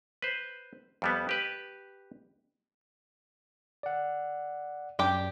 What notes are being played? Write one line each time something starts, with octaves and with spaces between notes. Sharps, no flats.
B4 C5
F2 G3 B3
G4 B4
D5 F#5
F#2 D4 G4 D5 G5